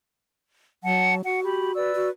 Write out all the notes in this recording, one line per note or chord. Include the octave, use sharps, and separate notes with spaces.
F#3 F#5 A5
F#4 F#5
G4 B5
B4 D5 E6
F#4